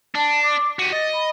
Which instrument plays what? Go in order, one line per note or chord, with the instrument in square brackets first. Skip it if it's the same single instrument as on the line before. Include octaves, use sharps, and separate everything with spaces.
[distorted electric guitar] D4 [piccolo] A5
[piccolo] D6
[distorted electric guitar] F#4 G4 [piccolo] D#7
[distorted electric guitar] D#5 [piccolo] A6
[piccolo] B5